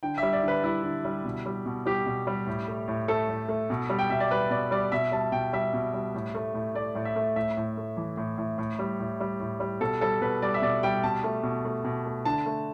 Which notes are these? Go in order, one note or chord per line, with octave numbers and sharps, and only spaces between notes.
D3 G5
G3 E5
D5
D3 B4
G3 E4
D3
G3
B2
G3
B2
G3 G4
B2
G3
A2
A3
A2
A3 A4
A2
A3
B2
G3
G5
B2 E5
D5
G3 B4
B2 D5
G3 D5
B2 E5
G3 A5
B2 G5
G3 E5
B2
G3
A2
A3
A2
A3 D5
A2
E5
A3
A2 E5
A2
A3
E3
A2
A2
A2
G3
A2
G3
A2
G3
B2 A4
G3 A4
B2 B4
G3 D5
E5
B2 D5
G3 G5
B2 A5
A3
B2
A3
B2
A3
D3 A5
A3